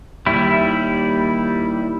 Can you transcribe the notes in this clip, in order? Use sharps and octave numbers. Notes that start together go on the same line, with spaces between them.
D#2 G3 E4